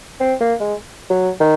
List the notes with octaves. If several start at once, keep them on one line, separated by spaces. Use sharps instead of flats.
C4
A#3
G#3
F#3
D#3